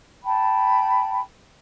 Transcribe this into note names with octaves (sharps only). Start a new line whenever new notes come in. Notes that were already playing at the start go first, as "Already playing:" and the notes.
G5 A5 B5